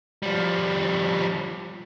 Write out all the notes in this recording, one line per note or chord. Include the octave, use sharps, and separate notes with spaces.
F3 G3